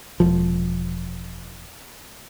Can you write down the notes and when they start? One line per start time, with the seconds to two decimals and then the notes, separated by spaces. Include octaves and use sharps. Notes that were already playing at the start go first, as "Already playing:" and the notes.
0.20 E1 F3